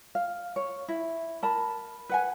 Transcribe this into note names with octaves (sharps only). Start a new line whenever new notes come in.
F5
C#5
E4
A#4 A5 B5
B4 F#5 G#5